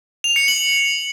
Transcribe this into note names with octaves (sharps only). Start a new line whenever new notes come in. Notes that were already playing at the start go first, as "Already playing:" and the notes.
F7
C#7
F#7